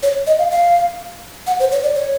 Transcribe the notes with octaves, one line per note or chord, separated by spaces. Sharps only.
C#5
D#5
F5
F5
F#5
C5
C#5
D5
C#5